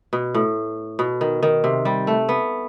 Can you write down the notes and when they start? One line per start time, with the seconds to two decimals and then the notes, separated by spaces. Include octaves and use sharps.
0.13 B2
0.34 A2
0.99 B2
1.21 D#3
1.43 D#3
1.64 C3
1.85 G3
2.07 A3
2.29 B3